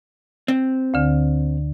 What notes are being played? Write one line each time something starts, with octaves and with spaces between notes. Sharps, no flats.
C4
D2 D3